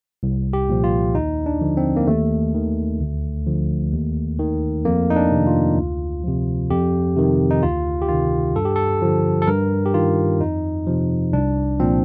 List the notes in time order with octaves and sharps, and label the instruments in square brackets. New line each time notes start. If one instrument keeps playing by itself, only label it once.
[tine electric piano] C2
G4
A#2 F3
F4
D#2 D#4
D4
D3 F3
C4
A#3
D#2 A3
D#3
D2
D3 F3
D#2
D#3
F2 A#3
D#4
D4
C3 D#3
F4
D2
C3 F3
F2 G4
C3 D#3
D#4
D2 F4
G4
C3 D#3 F4
G2 A4
G4
A4
D3 F3
A4
G2 A#4
G4
D#3 F4
F2 D#4
C3 F3
C2 D4
A#2 F3 C4